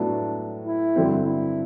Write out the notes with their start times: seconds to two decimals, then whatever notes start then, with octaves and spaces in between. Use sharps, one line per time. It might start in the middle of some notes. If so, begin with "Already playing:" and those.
Already playing: A2 F#3 B3 D4
0.67 E4
0.96 G2 D3 F#3 C4
1.25 E4